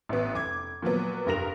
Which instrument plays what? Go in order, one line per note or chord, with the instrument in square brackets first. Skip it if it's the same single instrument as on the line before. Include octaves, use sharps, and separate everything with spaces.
[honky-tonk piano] A1 B3
F1 D6 G#6
A#2 F3 F#3 B3
F1 G2 A#4 A#6 F7